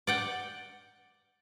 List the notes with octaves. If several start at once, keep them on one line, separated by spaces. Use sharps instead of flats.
D5 F#5 G5